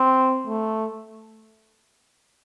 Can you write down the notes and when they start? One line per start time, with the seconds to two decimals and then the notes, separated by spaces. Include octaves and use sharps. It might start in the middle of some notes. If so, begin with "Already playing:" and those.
Already playing: C4
0.47 A3